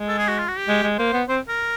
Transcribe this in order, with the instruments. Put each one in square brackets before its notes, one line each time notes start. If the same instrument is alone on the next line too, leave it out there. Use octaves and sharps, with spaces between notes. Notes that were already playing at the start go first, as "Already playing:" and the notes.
Already playing: [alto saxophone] G#3
[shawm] A4
G#4
F#4
F4
F#4
G4
[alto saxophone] G#3
G#3
[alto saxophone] A#3 [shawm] C5
[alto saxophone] B3
[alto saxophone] C4 [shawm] C5
[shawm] A#4